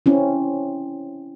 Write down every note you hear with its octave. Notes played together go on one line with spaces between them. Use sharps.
C4 C#4 E4